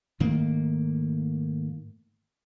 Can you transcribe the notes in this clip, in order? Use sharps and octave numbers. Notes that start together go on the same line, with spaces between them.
G#2 D#3 A3 A#3